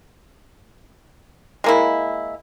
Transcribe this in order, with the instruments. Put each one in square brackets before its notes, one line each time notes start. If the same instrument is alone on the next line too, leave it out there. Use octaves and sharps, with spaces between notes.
[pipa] G#3 A#3 E4